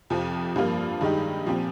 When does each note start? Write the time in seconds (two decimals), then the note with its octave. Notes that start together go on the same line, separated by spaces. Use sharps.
0.10 F2 C3 F3
0.56 G2 F3 A#3 F4
1.01 G2 D#3 G#3 D#4 G4
1.46 A#2 F3 C4 G4